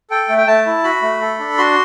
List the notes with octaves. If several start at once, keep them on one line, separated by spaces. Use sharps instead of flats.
A4 G5
A3
G5
A3 A5
E4
F#4 B5
A3
A4
D4
F#4 C6